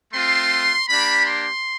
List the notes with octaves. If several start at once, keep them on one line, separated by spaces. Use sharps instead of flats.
A3 C4 F4 C6
A#3 D4 G4 B5
C6